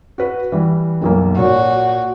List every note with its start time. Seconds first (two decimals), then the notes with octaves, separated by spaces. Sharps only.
0.18 F#4 B4
0.52 E3 G3
1.02 F#1 B1 A#3
1.39 A#2 F#4 C#5